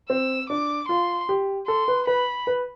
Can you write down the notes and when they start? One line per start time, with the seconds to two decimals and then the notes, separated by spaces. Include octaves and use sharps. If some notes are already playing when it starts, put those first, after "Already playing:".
0.10 C4 E6
0.50 D4 D6
0.89 F4 C6
1.29 G4
1.67 A4 C6
1.88 B4
2.07 B4 B5
2.47 B4